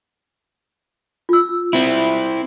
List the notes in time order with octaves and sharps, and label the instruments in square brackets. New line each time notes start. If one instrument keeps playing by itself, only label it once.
[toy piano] F4 E6
[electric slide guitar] C4 E4